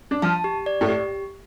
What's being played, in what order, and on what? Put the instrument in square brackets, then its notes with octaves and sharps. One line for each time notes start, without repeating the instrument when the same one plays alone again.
[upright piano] D4
[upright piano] F3 F4 [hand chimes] A5
[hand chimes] G4
D5
[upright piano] A2 A3
[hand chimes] G4